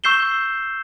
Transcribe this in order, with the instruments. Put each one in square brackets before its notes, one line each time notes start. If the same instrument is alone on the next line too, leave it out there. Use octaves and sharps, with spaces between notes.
[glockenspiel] C#6 E6 G6 C7 E7 G7